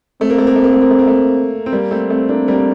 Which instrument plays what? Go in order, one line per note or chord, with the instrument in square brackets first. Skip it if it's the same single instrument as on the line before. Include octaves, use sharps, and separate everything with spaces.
[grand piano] A3 [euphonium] C4
[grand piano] A#3
A3
A#3
A3
A#3
A3
A#3
A3
A#3
A3
C4
G3 A#3
A3 C4
[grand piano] A3 [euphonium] C4
[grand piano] A#3 D4
G3 A#3